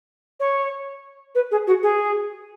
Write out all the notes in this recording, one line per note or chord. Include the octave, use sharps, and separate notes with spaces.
C#5
B4
G#4
F#4
G#4